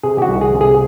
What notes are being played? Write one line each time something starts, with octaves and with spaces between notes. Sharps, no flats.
C3 G#4
G4
F#4
C2
G#4
C3
G#4